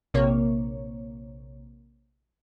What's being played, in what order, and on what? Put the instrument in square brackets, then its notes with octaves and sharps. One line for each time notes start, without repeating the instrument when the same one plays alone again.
[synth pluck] A#1 C3 A#3 C#5